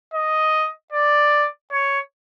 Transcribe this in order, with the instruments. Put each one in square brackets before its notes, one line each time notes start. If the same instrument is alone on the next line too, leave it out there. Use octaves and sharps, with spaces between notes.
[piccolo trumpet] D#5
D5
C#5